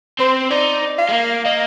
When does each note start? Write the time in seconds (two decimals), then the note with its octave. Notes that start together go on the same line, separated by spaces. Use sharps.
0.19 C4 C5
0.51 D#4 D5
0.98 F5
1.09 G#3
1.13 A#3
1.45 A#3 D#5